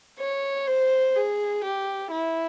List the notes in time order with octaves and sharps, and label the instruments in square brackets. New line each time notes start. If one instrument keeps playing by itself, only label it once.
[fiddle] C#5
C5
G#4
G4
E4